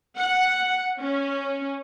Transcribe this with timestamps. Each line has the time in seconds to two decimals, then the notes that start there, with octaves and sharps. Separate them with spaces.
0.18 F#5
0.99 C#4